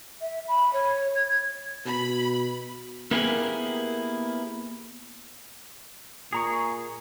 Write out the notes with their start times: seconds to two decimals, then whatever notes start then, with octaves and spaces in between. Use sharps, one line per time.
0.21 E5
0.48 B5
0.73 C#5
1.15 G#6
1.86 B2 B5
3.11 A#3 B3 E4 G4 G#4 A#4
6.33 A#2 G#4 A#5 C#6